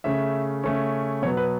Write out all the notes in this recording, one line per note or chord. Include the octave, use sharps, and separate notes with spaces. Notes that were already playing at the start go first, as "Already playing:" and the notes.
C#3 A3 C#4 E5
C#3 A3 C#4
B2 F#3 B3 C#5
B4